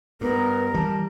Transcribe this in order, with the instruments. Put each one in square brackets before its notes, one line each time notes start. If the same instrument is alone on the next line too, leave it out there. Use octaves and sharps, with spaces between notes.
[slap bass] G2 [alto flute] B3 [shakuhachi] A#4
[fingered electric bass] E3 [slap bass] G3 [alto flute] A5